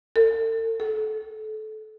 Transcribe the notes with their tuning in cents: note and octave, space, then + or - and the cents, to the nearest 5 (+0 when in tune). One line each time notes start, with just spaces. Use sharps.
A4 +45
A4 -25